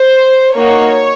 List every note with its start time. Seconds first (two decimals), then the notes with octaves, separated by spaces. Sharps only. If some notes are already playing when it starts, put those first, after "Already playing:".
Already playing: C5
0.55 A#3 D#4 F#4 C#5